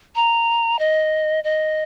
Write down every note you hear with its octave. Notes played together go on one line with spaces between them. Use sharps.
A#5
D#5
D#5